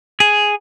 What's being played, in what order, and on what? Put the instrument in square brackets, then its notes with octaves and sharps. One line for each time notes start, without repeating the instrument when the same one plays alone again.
[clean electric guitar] G#4